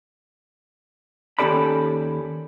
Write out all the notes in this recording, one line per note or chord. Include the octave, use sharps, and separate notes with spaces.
D#2 C#4 G4 A4 D5 B5